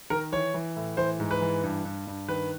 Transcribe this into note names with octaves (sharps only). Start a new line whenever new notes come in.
D#3 A#4
E3 C#5
E3
A2
E3 C5
G#2
B4
E3
G2
G2
G2
D#3 B4